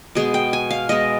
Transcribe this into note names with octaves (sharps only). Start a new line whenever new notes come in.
B2 G#3 B3 G#4
G5
G#5
F5
B2 G#3 B3 D#5